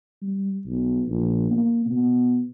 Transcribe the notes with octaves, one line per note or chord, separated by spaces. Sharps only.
G3
B1
A#1
A#3
B2